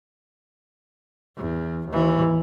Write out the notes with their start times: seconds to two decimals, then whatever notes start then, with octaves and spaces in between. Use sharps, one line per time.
1.37 E2
1.88 D#2 E3